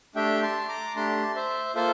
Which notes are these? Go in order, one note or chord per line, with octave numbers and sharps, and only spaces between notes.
A3 D4 G4 E5 G5
A5 C6
A#5 D6
A3 D4 G4 A5 C6
C5 E5
A#3 F4 A4 C5 E5